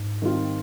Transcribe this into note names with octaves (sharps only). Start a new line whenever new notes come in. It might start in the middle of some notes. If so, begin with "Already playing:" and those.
Already playing: G#2
D#3 G3 C4 F4